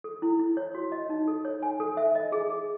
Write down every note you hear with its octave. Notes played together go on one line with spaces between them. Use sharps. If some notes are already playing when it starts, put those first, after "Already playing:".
A4
E4
E4
C#5
F#4
D#5
D#4
A4
C#5
G#5
A4
E5
D#5
G#4
G#4